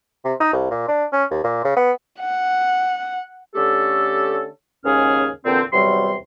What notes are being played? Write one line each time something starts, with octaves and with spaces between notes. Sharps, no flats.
C3
D#4
C2
A#2
D4
C#4
D#2
A#2
C#3
B3
F#5
D3 A3 C#4 G4 A4
D#2 G#2 C#3 C#4 G#4 F6
E2 A#2 D3 C4
E2 C3 F#3 G3 C6